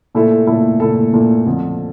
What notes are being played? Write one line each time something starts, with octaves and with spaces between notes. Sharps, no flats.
A#2 A3 E4 A4
A#2 A3 E4 A4
A#2 A3 E4 A4
A#2 A3 E4 A4
F2 D3 F3